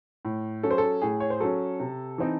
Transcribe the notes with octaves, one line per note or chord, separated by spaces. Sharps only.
A2
F#3 C#4 A4
C5
A4
A2 G#4
C#5
C5
F#3 C#4 A4
C3
E3 C4 D#4